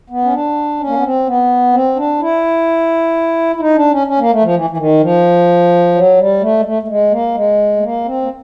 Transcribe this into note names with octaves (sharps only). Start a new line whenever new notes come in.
B3
C#4
D4
C#4
A#3
B3
C4
B3
C4
D4
E4
E4
D#4
D4
C#4
C#4
A#3
A3
F3
E3
E3
D#3
F3
F#3
G3
A3
G#3
A3
A3
G#3
A#3
G#3
A3
A#3
C4
A#3